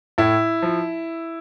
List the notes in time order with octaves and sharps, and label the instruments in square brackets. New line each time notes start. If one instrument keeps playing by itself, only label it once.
[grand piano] A2 E4
F3